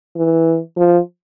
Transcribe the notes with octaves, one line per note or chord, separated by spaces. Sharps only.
E3
F3